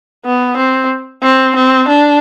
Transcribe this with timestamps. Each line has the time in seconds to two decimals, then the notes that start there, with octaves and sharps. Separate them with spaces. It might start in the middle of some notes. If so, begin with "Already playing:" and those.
0.25 B3
0.57 C4
1.22 C4
1.56 C4
1.88 D4